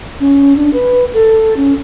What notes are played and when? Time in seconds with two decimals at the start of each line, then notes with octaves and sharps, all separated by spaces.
0.20 C#4
0.56 D4
0.73 B4
1.14 A4
1.57 C#4